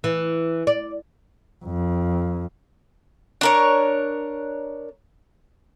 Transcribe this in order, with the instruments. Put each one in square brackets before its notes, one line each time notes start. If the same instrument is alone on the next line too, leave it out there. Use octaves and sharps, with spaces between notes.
[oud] E3
D5
[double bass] F2
[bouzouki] D4 A#4 C#5